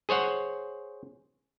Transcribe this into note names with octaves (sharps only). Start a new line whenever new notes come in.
G#4 C5 C#5 F#5